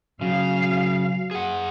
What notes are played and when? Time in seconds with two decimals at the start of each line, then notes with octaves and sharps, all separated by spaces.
0.21 C#3 F#3 F5
1.31 G#4 F#5